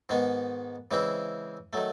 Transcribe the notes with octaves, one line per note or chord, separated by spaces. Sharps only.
G#2 D#3 G#3 B3
C#3 E3 G#3 C4 E4
D#3 F#3 A3